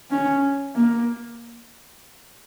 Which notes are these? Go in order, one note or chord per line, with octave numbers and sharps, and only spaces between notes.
C#4
A#3